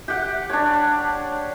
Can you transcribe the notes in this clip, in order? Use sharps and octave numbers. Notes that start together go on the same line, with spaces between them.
G4 F#5
D4 C#5